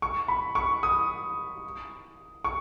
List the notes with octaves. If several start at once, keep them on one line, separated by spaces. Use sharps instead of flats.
C#6
B5
C#6
D#6
C#6